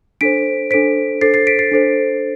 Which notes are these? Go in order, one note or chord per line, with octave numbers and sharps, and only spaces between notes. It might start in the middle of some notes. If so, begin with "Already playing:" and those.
D4 A4 C5 B6 D7
D4 A4 C5 B6 D7
D4 A4 C5 A6 C7
A6 C7
B6 D7
A6 C7
D4 A4 C5